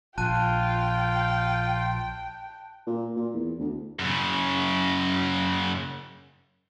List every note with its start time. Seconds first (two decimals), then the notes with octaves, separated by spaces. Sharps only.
0.18 A#1 F4 G5 A5 F#6 D#7
2.86 A#2
3.16 A#2
3.34 E2
3.59 D2
3.99 F#2 C#3